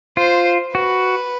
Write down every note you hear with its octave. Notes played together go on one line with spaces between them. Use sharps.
F4 C5
F#4 B4